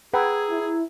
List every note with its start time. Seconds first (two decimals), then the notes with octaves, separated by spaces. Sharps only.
0.14 G#4 B4 F#5 G5 A#5 E6 G#6
0.50 E4